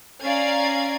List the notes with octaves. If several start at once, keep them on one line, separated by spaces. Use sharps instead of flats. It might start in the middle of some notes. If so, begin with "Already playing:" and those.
C#4 D5 F5 A#5 G#6 C7